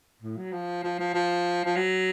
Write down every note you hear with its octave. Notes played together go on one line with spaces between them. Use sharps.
A2
F#3
F3
F3
F3
F3
F3
F#3